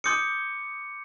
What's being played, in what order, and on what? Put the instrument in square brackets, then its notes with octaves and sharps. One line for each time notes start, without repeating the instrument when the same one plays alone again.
[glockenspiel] C6 D6 C#7 [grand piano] D#6 G6